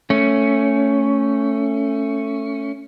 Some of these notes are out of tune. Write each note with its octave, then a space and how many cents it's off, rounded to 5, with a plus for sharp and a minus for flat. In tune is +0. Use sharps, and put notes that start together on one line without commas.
A3 +15 C#4 +0